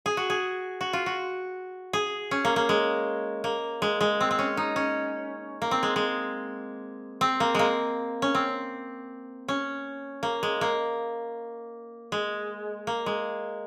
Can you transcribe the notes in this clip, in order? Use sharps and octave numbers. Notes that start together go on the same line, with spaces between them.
G#4
F#4
G#4
F#4
F4
F#4
G#4
C#4
A#3
A#3
G#3
A#3
G#3
G#3
C4
C4
C#4
D#4
C#4
A#3
C4
G#3
G#3
C4
A#3
G#3 A#3
C#4
C4
C#4
A#3
G#3
A#3
G#3
A#3
G#3